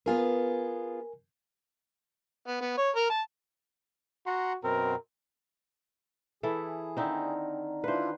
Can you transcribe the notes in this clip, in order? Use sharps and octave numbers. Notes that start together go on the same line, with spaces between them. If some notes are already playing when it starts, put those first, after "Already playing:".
B3 F4 G#4 A#4 G#5
B3
B3
C#5
A#4
A5
F#4 F#5 A#5 C6
F#2 B2 C4 A#4
E3 E4 G#4 A4
D3 D#3 C4 D#4 E4 A#4
D4 E4 F4 B4 C5